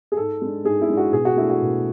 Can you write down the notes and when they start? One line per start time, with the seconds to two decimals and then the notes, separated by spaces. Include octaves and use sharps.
0.12 G#4
0.17 G#2 A4
0.41 G#3 D4
0.64 G#2 G#4
0.81 E4
0.89 G#3 D4
0.97 F#4
1.12 B2 G#4
1.25 F#4
1.36 A3 D4 E4
1.50 F#4
1.61 B2